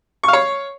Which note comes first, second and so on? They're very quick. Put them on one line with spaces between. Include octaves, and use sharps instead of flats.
C#6 F5 C#5